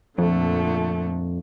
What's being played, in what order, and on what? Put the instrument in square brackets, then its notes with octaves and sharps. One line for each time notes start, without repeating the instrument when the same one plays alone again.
[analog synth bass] F2 [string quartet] A#2 D3 A3